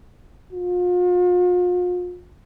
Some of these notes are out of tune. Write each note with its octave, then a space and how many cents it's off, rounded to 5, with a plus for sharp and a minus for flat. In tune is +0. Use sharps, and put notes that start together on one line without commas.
F4 +40